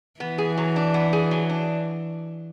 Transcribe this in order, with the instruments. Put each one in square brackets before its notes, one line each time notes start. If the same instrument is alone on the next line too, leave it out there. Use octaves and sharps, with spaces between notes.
[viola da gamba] E3 [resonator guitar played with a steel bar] B3
[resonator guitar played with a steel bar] G#4
F#3
D4
B3
G#4
F#3
D4